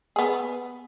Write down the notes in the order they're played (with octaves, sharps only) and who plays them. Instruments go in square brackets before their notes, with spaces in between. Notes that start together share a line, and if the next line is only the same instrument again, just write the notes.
[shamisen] B3 G#4